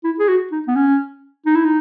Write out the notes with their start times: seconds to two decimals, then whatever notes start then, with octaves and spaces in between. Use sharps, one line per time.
0.04 E4
0.19 G#4
0.28 F#4
0.52 D#4
0.67 B3
0.76 C#4
1.46 D#4
1.55 E4
1.65 D#4